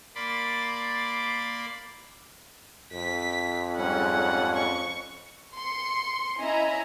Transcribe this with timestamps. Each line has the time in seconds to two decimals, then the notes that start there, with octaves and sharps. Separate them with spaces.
0.15 A#3 D5 B5 C6 D6 A6
2.93 F2 B6
3.77 G#2 G3 C#4 F#5
4.56 C#6
5.59 C6 C#7
6.39 C#4 E4 D#5 E5 G#5 A#5